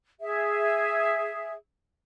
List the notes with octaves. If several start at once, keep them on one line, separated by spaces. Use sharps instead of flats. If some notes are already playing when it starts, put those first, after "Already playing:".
G#4 E5